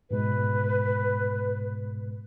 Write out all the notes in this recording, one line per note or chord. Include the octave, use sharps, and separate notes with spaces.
G#2 B2 G#3 B4